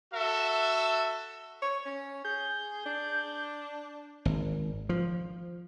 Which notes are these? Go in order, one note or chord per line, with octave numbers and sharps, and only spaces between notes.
F#4 A4 E5
C#5
C#4
G#4 G6
D4
G#1
F3